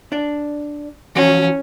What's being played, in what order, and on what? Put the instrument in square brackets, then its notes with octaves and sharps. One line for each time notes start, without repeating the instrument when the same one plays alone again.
[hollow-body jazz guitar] D4 D5
[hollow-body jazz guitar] E3 F3 F#4 [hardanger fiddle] C#4